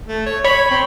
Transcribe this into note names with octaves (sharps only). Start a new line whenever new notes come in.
A3
C#5
C#5 B5
C4